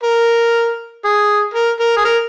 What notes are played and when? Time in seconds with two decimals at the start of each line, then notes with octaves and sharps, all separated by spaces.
0.03 A#4
1.05 G#4
1.54 A#4
1.80 A#4
1.97 G#4
2.05 A#4